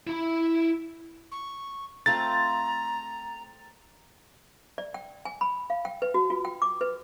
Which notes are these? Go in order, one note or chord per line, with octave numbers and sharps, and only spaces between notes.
E4 B5
C#6
A3 C4 F4 A#5 A6
D5
G5
G#5
B5
F5
G5
B4
F#4
F4
G5
D6
B4